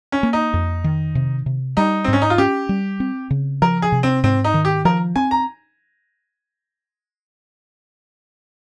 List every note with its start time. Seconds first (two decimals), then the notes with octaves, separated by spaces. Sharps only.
0.12 C#4
0.23 A#3
0.33 D#4
0.54 F2
0.84 D#3
1.15 C3
1.46 C3
1.77 G3 D#4
2.04 G#2 C4
2.13 C#4
2.22 D#4
2.30 F4
2.38 C#4 G4
2.69 G3
3.00 C4
3.31 C#3
3.62 F3 A#4
3.82 G#4
3.92 C3
4.03 C4
4.24 G#2 C4
4.44 D#4
4.54 D#3
4.65 G4
4.85 F3 A#4
5.16 C4 G#5
5.31 A#5